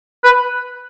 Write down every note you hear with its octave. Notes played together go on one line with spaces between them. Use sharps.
B4